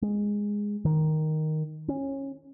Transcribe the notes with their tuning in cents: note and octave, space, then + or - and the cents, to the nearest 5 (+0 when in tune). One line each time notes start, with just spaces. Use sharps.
G#3 -10
D#3 +0
C#4 -20